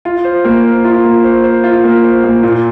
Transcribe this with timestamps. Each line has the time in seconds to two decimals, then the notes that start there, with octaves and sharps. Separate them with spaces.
0.05 F4
0.24 C5
0.45 A#3
0.64 C5
0.84 F4
1.04 A#3
1.24 C5
1.44 C5
1.64 F4
1.84 A#3
2.04 C5
2.24 A#3
2.43 A#2